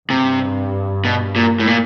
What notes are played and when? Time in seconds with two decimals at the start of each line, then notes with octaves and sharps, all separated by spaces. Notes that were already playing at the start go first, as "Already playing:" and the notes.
0.10 G2 C3
1.05 B2
1.36 A#2
1.59 A2
1.67 A#2